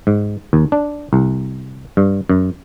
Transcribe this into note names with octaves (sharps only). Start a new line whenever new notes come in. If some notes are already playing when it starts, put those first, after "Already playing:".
G#2
D#2
D4
C2
G2
F#2